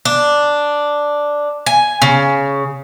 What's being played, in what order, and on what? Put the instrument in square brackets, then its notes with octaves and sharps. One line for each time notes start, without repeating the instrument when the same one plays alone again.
[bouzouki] D4
G#5
C#3